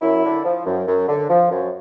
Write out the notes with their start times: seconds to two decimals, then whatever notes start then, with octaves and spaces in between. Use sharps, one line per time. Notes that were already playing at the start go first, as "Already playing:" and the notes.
0.01 F#2 E4
0.23 D3
0.45 F3
0.66 F#2
0.87 F#2
1.08 D3
1.30 F3
1.51 F#2